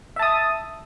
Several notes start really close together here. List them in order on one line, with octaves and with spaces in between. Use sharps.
E5 A5 D#6